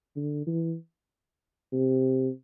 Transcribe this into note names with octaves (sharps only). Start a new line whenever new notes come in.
D3
E3
C3